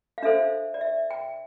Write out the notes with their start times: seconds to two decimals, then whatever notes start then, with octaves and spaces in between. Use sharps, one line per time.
0.18 F5
0.23 D4 A4 C5 E5
0.74 D5
0.81 E5
1.11 G5